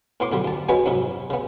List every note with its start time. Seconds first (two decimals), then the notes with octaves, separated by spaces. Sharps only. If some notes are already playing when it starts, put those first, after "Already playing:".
0.20 A2 B3 C6 D6
0.32 B1 D3 G3
0.45 D2 A5
0.69 G#3 B3 C#4 F#4 B4
0.86 F2 G#2 C3 F#3
1.30 C#3 B3